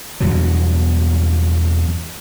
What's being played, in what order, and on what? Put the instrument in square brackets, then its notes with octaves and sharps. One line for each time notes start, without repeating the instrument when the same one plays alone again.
[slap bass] E2 G2 B2 F#3